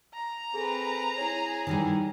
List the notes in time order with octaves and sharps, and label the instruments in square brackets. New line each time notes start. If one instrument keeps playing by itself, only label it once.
[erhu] A#5
[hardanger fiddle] C4 B4 [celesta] G#4 A4 G#5
[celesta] E4 C#5 [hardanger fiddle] G#4
[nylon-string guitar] D#3 E3 G3